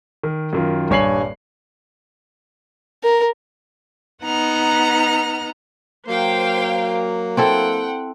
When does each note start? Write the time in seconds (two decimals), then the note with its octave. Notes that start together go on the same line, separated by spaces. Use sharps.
0.23 D#3
0.53 F#2 D#3 F4
0.90 D#1 G2 C#5 G#5 C7 F#7
3.04 A#4
4.23 B3 D#4 F#5 A#5 F6
6.08 F#3 A#3 C5 F5 G5
7.37 C4 E4 A4 F#5 G5